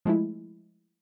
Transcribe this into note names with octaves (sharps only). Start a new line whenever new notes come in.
F3 G#3 A3 E4